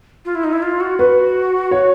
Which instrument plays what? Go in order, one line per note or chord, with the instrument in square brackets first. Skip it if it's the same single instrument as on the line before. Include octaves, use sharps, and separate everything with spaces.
[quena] F4
E4
D#4
E4
F4
F#4
[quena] F#4 [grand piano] B4
[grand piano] C#5